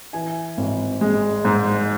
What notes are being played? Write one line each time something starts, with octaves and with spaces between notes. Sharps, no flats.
E3 G#5
G#1
G#3
G#2